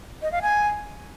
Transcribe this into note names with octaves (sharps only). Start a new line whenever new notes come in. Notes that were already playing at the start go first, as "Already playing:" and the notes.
D#5
F5
G#5